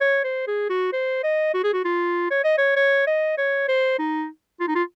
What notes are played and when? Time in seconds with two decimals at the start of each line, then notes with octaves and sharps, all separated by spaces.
0.01 C#5
0.24 C5
0.47 G#4
0.70 F#4
0.93 C5
1.24 D#5
1.54 F#4
1.64 G#4
1.73 F#4
1.85 F4
2.31 C#5
2.44 D#5
2.58 C#5
2.76 C#5
3.07 D#5
3.38 C#5
3.68 C5
3.99 D#4
4.60 F4
4.68 D#4
4.75 F4